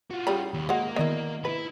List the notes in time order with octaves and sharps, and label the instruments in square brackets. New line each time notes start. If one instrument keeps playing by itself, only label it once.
[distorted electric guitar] F4 F#4
[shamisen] C#3 G3 B5
[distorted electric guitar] D#2
[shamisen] G#3 F#4 F#5 [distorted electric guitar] A#3
[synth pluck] D#3 D5 D#5 [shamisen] B3 E4
[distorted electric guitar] E4 B5 [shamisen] B4